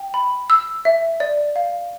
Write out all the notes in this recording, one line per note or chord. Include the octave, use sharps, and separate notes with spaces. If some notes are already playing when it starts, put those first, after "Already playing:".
Already playing: G5
B5
E6
E5
D5
F5